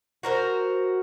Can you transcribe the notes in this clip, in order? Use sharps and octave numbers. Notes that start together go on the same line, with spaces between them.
F#4 A#4 C5